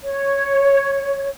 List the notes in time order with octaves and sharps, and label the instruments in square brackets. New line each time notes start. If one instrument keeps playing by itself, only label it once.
[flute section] C#5